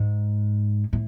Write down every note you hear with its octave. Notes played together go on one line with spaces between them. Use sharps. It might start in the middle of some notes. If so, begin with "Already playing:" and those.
Already playing: G#2
A2